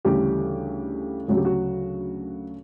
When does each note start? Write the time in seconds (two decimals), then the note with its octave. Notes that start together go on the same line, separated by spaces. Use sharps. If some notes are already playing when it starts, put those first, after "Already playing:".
0.05 D2 C#3 E3 G3 G4
1.28 D2 C#3 F#3 F#4
1.37 G4
1.45 F#4